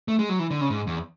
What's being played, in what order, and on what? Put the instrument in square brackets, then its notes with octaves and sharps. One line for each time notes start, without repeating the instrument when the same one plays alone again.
[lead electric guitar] A3
G#3
F#3
E3
D3
C#3
G#2
E2